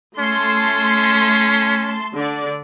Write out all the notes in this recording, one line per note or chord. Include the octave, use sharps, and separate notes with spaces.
A3 C#4 A5 C6
D3 D5